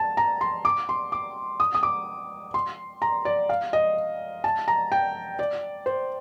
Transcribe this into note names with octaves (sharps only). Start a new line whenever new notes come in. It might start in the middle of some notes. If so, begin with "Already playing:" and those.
Already playing: A5
A#5
C6
D6
C6
D6
D#6
D#6
D6
C6
A#5
D5
F5
D#5
A5
A#5
G5
D5
C5